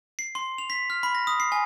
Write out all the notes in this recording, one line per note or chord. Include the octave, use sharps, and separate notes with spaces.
C7
C6
F7
B6
F6
B5
A#6
D#6
C7
G#5